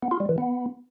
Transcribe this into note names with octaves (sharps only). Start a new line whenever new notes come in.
B3
F4
G3
E3
B3